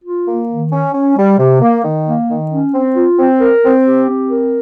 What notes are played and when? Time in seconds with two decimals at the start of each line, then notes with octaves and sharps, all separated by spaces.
0.05 F4
0.27 A#3
0.50 D#3
0.72 C#4
0.94 C#4
1.17 G3
1.39 C3
1.62 A#3
1.84 D#3
2.07 A#3
2.29 D#3
2.51 C#4
2.74 C4
2.96 F4
3.18 C4
3.41 A#4
3.63 C4
3.86 G4
4.08 C4
4.31 A#4